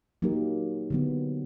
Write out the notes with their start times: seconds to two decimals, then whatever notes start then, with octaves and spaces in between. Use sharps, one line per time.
0.22 F#3 A#3 D#4 G4 A#4
0.90 D3 F#3 B3